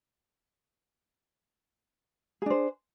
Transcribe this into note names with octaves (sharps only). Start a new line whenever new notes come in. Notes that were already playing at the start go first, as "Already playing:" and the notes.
D4 G#4 C5